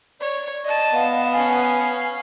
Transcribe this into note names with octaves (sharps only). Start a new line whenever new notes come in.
C#5 D5
D5 D#5 A5
B3 F5
C#4 F5 G#5